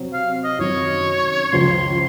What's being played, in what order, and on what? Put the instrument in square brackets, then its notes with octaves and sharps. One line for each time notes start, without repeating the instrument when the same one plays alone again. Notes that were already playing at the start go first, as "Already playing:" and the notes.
Already playing: [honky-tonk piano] C3 F#3 C4
[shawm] F5
D#5
[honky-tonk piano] F#2 D#3 F#3 [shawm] C#5
[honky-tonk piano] C#2 C#3 F3 [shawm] C6